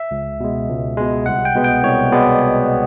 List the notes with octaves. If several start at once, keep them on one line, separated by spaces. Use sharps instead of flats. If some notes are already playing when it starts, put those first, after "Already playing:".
Already playing: E5
C#2
B2 G#3
C#2
B2 G#3
C2 F#5
G5
B2 G#3 B3
G5
C2 C#5
B2 G#3 B3 D5